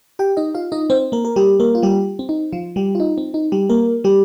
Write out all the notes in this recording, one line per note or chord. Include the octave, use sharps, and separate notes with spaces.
G4 G5
D#4 D#5
F4 F5
D#4 D#5
C4 C5
A#3 A#4
A#4
G3 G4
A#3 A#4
F4
G3 G4
C4
D#4
F3 F4
G3 G4
F4
D#4
C4
D#4
G3 G4
A#3 A#4
G3 G4